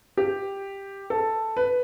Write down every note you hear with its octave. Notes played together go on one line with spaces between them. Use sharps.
G4
A4
B4